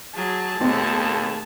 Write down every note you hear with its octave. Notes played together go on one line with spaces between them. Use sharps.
F#3 G#4 A5
D#2 B2 A3 C4 G#4